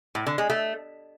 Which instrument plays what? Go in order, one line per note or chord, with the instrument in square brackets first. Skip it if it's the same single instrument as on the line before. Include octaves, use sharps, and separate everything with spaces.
[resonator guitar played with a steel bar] A2
D3
G#3
A3